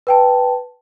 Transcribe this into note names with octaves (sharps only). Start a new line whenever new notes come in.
B4 G5 A5